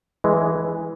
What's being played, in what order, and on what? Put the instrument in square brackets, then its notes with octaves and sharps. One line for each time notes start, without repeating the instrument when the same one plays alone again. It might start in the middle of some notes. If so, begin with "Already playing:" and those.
[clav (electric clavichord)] E3 G#3